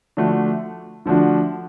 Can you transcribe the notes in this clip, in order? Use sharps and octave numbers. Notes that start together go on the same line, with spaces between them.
D3 F3 A3 D4 F#4
D3 F3 A3 D4 F#4